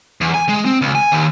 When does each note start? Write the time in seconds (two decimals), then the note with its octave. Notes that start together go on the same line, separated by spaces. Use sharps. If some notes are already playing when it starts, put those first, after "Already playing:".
0.21 E2
0.34 G#5
0.49 G#3
0.65 C4
0.82 C#2
0.95 G#5
1.12 D#2